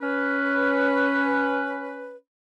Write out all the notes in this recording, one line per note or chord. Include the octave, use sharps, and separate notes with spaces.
C#4 B4